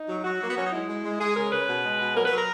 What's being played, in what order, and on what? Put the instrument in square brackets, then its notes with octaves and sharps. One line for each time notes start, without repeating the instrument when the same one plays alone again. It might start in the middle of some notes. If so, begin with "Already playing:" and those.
Already playing: [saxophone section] D#4
F#3
F#3 F#4
F#3 A#3
B3
F#3 C#4
D#4
G#3 E4
G#3
G#3
G#3 G#4
C#3 A#4
C#3 B4
B2
G#3
B2
F#3 A#4
B4
F#3 A#4